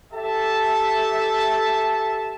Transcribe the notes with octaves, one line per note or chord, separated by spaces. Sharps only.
G4 A4 E5 A5